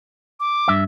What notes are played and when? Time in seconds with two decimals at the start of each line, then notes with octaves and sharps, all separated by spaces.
0.40 D6
0.68 G2 E5